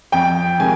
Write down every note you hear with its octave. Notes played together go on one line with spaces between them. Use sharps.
F2 G5
C3 D#3 G#3 G#5